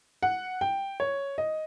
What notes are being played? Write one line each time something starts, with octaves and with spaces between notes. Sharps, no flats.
F#5
G5
C#5
D#5